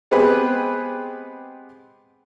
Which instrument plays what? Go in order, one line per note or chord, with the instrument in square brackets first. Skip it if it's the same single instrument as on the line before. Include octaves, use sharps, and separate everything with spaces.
[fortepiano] G#3 B3 C4 G4 G#4 B4